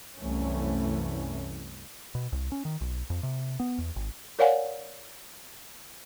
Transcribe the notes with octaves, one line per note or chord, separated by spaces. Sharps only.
C2 F#2 E3 A3 C#4
B2
C2
C#4
D#3
B1
F2
C3
B3
E2
G#1
A#4 C#5 D5 F5 F#5 G#5